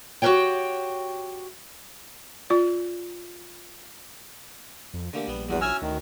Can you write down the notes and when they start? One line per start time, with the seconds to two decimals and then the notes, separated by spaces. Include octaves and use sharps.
0.22 F#4 G4 A#4 B4 C#5 G5
2.50 F4 D5
4.94 F2
5.13 D3 A3 A#3 G4
5.27 A#1 G3 B3
5.49 E2 G3 F#4 B4
5.61 C#4 E4 F#4 G#5 E6 F6
5.82 D2 D#3